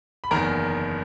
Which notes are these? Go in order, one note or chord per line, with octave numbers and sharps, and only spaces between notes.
B5
F#1 E2 D#3 A#4 A#5